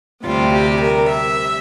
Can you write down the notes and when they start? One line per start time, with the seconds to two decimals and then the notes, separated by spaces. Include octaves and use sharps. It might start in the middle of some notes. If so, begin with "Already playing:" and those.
0.23 D2 C3 G3 F4
0.53 G4
0.81 A#4
1.08 E5